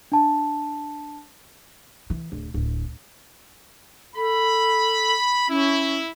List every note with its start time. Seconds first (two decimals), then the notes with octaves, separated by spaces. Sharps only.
0.12 D4 A5
2.10 E3
2.32 D1
2.54 D1
4.15 A4 B5
5.48 C#4 E4